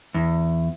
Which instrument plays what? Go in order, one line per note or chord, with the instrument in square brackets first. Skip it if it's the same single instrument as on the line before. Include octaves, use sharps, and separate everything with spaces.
[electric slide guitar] E2